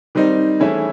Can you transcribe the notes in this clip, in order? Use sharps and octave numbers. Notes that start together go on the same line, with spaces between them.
D#3 G3 C4 D#4
E3 A3 C#4 E4 G#4